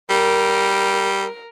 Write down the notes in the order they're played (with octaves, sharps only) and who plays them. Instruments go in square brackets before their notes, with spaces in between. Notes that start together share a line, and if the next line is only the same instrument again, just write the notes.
[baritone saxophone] G3 [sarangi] A#4